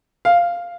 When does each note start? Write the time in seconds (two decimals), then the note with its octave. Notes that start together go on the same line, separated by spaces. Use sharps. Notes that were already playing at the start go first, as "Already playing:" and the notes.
0.25 F5